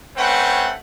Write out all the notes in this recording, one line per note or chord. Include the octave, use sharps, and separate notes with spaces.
A3 C4 C#4 B4 F#5 G5